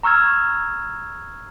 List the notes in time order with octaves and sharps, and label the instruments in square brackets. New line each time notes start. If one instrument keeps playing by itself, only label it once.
[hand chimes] A#5 C#6 E6 F6 G#6